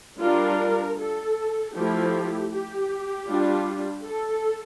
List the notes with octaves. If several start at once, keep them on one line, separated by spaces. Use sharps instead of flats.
G3 D4 F4 A#4
A4
F3 A3 E4 G4
G4
G3 D4 F4
A4